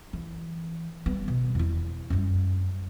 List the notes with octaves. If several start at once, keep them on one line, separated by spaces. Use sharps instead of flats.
E3
G3 B3
B2
E2 E4
F#2 G3